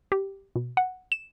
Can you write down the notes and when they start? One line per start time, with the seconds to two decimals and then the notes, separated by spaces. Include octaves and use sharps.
0.12 G4
0.56 B2
0.77 F#5
1.12 E7